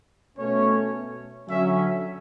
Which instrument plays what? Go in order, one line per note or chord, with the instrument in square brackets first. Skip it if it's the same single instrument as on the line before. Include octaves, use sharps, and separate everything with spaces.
[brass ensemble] B2 A3 C#4 C#5
D3 F#3 C#4 E5